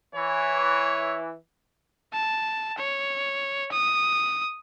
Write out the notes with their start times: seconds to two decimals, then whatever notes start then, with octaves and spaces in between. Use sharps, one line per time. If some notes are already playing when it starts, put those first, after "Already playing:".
0.15 E3 C#5
2.13 A5
2.78 C#5
3.72 D#6